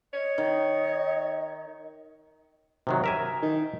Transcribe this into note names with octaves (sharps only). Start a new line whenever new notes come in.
C#5 D#5
D#3
C3 D#3 F#3
A#4 E5 G#5
D#3